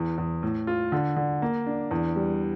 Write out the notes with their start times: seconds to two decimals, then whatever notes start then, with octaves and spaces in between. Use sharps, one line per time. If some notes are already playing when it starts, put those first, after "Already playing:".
Already playing: E2
0.18 E2
0.43 A2
0.67 F4
0.92 D3
1.16 D3
1.42 A#3
1.66 D4
1.91 E2
2.16 G3